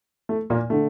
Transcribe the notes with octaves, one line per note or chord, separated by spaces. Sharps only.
A3
A#2 A#3
D3 A3